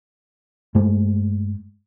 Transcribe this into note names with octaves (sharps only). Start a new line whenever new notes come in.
G2 G#3 A3